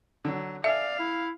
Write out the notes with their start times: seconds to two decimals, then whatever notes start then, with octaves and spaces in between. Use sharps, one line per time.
0.25 D3 F#3
0.64 A4 D5 E5 F5 G#5
0.99 E4